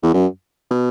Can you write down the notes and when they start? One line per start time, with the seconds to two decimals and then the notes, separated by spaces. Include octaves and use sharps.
0.03 E2
0.14 F#2
0.71 B2